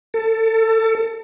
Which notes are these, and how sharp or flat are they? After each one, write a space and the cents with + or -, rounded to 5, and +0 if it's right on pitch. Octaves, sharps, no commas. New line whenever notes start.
A4 +25